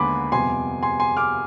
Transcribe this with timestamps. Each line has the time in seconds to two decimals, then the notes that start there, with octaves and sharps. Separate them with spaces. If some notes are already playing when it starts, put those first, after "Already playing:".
Already playing: D#2 D3 G#3 B3 G#5 B5 C6 D6
0.32 F2 C3 G3 B3 G#5 C6
0.83 G#5 C6
1.00 G#5 C6
1.17 D6 F6